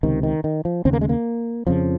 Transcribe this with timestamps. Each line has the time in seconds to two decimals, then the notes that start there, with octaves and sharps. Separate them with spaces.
0.03 C#2 C3 D#3
0.23 D#3
0.44 D#3
0.65 F3
0.85 D#2 C#3 C4
0.93 A#3
1.01 G#3
1.09 A#3
1.67 F2 C#3 F3